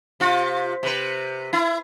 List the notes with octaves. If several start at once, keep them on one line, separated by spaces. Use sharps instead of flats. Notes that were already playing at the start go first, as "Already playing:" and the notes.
C3 F4
C3 B4
E4